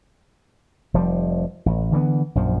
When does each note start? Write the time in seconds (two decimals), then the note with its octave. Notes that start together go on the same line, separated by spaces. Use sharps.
0.94 F1 F3 G3
1.66 A1
1.92 D3 E3 G3 B3
2.35 A#1 F#2 F3